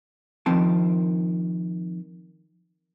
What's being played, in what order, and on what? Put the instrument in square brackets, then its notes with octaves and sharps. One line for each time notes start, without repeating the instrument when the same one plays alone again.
[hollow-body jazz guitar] D#3 F3 C4 A5